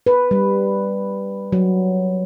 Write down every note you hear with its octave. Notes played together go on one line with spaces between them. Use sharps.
B4
G3
F#3